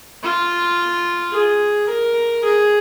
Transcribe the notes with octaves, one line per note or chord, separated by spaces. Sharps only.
F4
G#4
A#4
G#4